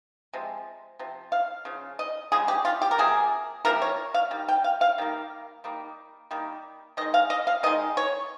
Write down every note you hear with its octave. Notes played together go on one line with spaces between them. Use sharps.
C3 F3 G#3
C3 F3
F5
C#3 F3
D#5
C#3 F3 G#3 G#4
G4
F4
G4
A#4
C3 F3 A#3 G#4
C3 F3 A#3 A#4
C#5
F5
D#3 G3
G5
F5
F5
D#3 G3 A#3
D#3 G3 A#3
D#3 G3 A#3
D#3 G#3 D#5
F5
D#5
F5
D#3 G#3 D#5
C#5